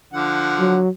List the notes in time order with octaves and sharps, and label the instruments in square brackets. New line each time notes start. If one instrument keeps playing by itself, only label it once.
[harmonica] D3 F3 F#5
[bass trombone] F#3